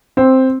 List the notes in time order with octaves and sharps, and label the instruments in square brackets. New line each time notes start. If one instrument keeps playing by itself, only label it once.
[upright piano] C4